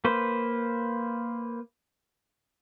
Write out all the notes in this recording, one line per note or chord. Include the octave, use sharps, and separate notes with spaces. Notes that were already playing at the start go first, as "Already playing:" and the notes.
A#3 B4 C5